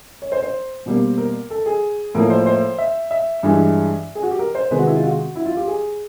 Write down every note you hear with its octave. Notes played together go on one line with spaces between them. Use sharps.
C#5
C5
C5
B2 G3 A#3
A#4
A4
G#4
A2 F3 A#3 A#4
C5
C5
E5
E5
G2 E3 G#3
G#4
F#4
G4
A#4
C5
C3 D#3 G#3 B4
F#4
E4
F4
F#4
E4
F4
G4
G#4